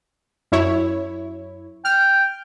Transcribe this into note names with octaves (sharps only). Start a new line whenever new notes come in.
F#2 E4 C#5
G5 F6